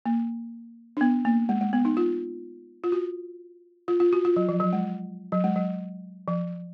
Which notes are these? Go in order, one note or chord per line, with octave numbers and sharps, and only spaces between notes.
A#3
D4
B3
A#3
G#3
G#3
B3
D#4
F4
F4
F#4
F4
F4
F#4
F4
F#3
F3
F#3
G#3
F#3
G#3
F#3
F3